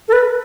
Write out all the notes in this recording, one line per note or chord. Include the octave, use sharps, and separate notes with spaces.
A4
B4